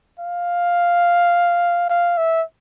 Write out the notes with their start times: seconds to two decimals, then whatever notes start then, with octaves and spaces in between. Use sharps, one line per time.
0.19 F5
1.89 F5
2.17 E5